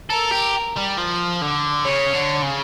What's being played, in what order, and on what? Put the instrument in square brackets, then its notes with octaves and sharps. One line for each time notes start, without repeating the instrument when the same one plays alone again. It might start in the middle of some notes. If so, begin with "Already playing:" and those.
[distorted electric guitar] A4 [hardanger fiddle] A#4
[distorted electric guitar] G4
G3
F3
D3
[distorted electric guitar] C#3 [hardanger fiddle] C#5
[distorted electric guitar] D3
C#3